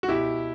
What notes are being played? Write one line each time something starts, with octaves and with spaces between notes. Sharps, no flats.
F#4
B2 E4 G4